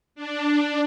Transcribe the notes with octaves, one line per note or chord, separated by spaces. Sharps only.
D4